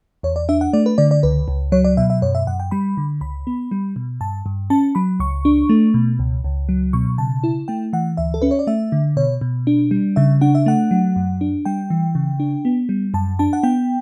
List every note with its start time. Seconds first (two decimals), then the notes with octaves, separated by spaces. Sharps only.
0.23 E2 C#5
0.36 D5
0.49 D4 E5
0.61 F#5
0.73 A3 D5
0.86 B4
0.98 D3 D5
1.11 D5
1.23 C#2 B4
1.48 C#2
1.72 F#3 C#5
1.84 D5
1.97 B2 E5
2.10 E5
2.22 F#2 C#5
2.35 E5
2.47 F#2 F#5
2.60 G5
2.71 G3 B5
2.97 D3
3.21 C#2 B5
3.47 B3
3.71 G3
3.96 B2
4.21 G2 A5
4.46 G2
4.70 C#4 A5
4.95 F#3 B5
5.20 C#2 C#6
5.45 D4
5.69 A3
5.94 B2
6.19 C#2
6.44 C#2
6.69 F#3
6.93 B2 C#6
7.18 C#3 A5
7.44 E4
7.68 A3 G5
7.93 E3 F#5
8.17 D2 E5
8.34 A4
8.42 C#4 B4
8.51 C#5
8.59 D5
8.67 A3 E5
8.92 D3
9.17 B2 C#5
9.41 B2
9.67 D4
9.91 G3
10.16 C#3 E5
10.41 D4 F#5
10.55 E5
10.66 A3 F#5
10.91 F#3
11.16 F#2
11.41 D4
11.65 G3 G5
11.90 E3
12.15 C#3
12.40 D4
12.65 B3
12.89 G3
13.14 F#2 A5
13.39 D4 A5
13.53 F#5
13.63 B3 G5